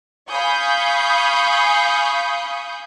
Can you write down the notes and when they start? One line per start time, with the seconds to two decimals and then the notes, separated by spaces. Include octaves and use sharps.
0.28 F5 G#5 B5 C#6 D#6 G6